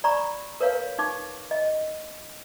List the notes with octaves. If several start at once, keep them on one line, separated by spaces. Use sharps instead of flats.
D5 A#5 B5 C#6
A#4 B4 C#5 F5
D#4 C#6 D6
D#5